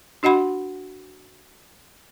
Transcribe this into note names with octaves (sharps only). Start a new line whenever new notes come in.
D4 F#4 D#5 F#5 B5 C6